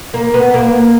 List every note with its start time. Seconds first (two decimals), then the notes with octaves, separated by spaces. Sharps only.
0.14 A#3
0.34 B3
0.54 A#3